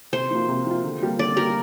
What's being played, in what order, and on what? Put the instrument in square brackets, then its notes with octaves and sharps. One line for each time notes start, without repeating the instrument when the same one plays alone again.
[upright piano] C3 [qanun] C5
[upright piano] F3 A#3 F4
C3
F3 A#3 F4
D3
G3 A#3 G4
[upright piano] D3 [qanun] D5
[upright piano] G3 A#3 G4 [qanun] A#4